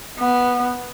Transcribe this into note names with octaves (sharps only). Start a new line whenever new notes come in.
B3